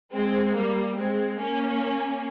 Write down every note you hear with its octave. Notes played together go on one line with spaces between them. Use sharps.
G#3 C4
G3 A#3
G#3 C4
A#3 C#4